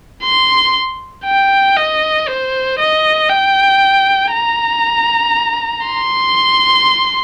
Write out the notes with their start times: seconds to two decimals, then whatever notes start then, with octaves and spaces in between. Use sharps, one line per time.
0.23 C6
1.25 G5
1.77 D#5
2.28 C5
2.79 D#5
3.30 G5
4.33 A#5
5.87 C6